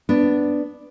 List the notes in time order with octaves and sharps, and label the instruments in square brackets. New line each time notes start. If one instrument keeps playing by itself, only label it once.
[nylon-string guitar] B3 D4